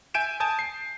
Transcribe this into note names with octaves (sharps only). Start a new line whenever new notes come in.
E5 G#5 G6 D7 E7
G#5 A5 D#6 G6
C7